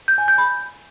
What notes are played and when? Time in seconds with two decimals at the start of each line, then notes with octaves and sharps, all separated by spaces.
0.08 G6
0.18 G#5
0.28 G6
0.38 B5